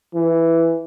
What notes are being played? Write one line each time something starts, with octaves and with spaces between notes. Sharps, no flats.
E3